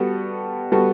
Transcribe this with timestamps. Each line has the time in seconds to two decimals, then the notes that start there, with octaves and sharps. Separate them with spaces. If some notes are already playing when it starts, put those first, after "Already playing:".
Already playing: G3 B3 F#4 A4
0.72 G3 B3 F#4 A4